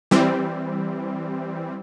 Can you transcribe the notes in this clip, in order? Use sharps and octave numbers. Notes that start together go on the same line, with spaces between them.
E3 G3 C4